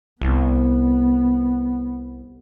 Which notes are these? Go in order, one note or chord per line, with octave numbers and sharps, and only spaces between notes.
C2 B3